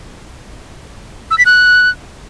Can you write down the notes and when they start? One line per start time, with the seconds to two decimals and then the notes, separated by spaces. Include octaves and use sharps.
1.31 E6
1.38 B6
1.46 F#6